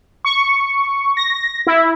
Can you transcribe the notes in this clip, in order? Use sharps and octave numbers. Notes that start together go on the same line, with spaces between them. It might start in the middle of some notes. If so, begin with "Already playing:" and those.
C#6
A#6
E4